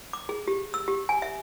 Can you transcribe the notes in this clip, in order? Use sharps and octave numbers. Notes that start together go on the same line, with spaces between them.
D6
G#4
G4
E6
G4
G#5
E5